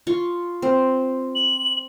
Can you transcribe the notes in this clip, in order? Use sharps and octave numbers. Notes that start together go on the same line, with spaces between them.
F4 C#6
C4
F#7